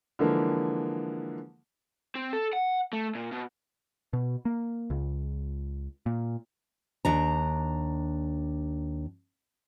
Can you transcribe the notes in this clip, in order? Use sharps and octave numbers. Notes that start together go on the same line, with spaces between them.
D3 E3 F3 G#3 A#3
C4
A4
F#5
A3
A#2
B2
B2
A#3
C#2
A#2
D#2 D4 A#5